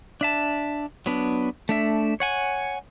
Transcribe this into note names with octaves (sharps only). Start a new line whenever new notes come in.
D4 E5 A5
F#3 B3 D4
A3 D4 E5
C#5 F#5 G#5